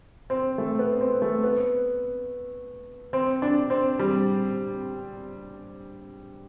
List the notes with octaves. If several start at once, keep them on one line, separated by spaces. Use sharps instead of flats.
C4
A3
B3
C4
A3
B3
C4
D4
C4
G3